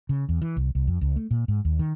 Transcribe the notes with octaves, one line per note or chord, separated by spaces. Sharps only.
C#3
E2
E3
C2
C2
F2
C#2
A3
A#2
G#2
D#2
D#3